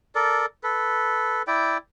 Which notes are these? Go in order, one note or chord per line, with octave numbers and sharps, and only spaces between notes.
A4 A#4 D5
A4 B4
E4 D5 G5